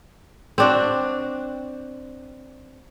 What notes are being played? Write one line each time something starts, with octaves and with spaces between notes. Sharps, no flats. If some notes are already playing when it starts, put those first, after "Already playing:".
C4 D4 F#4